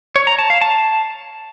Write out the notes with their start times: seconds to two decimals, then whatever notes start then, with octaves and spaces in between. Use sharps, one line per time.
0.16 C#5
0.27 A#5
0.39 A5
0.50 F5
0.62 A5